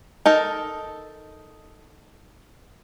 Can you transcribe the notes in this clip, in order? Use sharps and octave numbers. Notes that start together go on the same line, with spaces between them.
D#4 A4 A#4